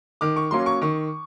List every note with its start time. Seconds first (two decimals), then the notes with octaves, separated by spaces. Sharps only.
0.21 D#3 D6
0.36 C#6
0.51 F#3 A#3 C#4 C6
0.66 C#6
0.81 D#3 C#6